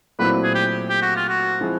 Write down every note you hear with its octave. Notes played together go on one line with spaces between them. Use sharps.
A#2 F#3 A3 C4 E4 B4
G#4
G4
G4
F#4
F4
F#4
F3 G#3 C4 E4 G#4